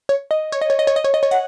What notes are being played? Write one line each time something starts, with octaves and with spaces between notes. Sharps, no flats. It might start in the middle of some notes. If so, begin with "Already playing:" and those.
C#5
D#5
C#5
D#5
C#5
D#5
C#5
D#5
C#5
D#5
C#5
F#5